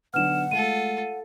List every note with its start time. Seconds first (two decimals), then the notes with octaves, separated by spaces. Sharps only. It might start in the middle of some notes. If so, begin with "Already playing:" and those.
0.14 B1 D3 B3 F#5 F6 E7
0.51 G#3 A3 F4 A4 D#7